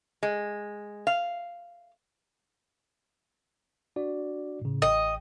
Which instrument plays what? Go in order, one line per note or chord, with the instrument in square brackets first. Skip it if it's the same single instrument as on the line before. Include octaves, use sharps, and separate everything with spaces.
[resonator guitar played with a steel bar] G#3
F5
[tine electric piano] D4 F#4 D5
A2 C#3
[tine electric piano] A1 G5 [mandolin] D#5